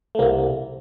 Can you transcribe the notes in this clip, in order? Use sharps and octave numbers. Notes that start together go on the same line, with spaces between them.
A3
C2 A#3